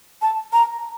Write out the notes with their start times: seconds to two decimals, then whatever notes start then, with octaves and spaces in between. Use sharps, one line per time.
0.22 A5
0.53 A#5